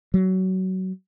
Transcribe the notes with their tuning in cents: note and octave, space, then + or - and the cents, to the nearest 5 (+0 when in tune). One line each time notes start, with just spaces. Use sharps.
F#3 +20